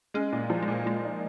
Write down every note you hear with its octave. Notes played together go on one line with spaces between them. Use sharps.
G#3 C#4
A#2
F3
G#3
A#2
A#2 G#3
D#4